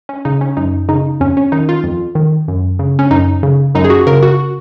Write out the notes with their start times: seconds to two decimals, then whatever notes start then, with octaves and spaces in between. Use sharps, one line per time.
0.09 C#4
0.25 C#3 D#4
0.41 C#4
0.57 F#2 D#4
0.89 C#3 D#4
1.20 F2 C#4
1.37 C#4
1.52 D#3 D#4
1.69 F4
1.84 F2
2.15 D#3
2.48 F#2
2.79 C#3
2.99 C#4
3.11 F#2 D#4
3.43 C#3
3.75 F#2 D#4
3.84 G#4
3.90 F#4
4.07 C#3 A#4
4.23 F#4